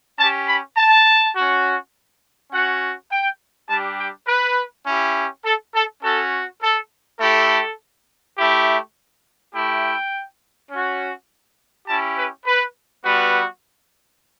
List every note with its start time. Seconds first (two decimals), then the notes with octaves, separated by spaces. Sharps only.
0.18 C#4 A5
0.22 G4
0.47 B5
0.76 A5
1.35 C#4 F#4
2.52 C#4 F#4 F#5
3.11 G5
3.68 G3 D4 G4 A5
3.98 G5
4.27 B4
4.85 C#4 E4 G4
5.45 A4
5.74 A4
6.03 C#4 F#4 A4
6.61 A4
7.19 A3 E4 G4 A4
8.37 A3 E4 G4
9.53 A3 E4 G4 G5
10.71 C#4 F#4
11.87 C#4 E4 G4 A5
12.16 B4
12.46 B4
13.04 G3 B3 F#4 B4